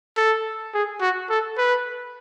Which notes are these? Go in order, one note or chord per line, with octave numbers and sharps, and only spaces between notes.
A4
G#4
F#4
A4
B4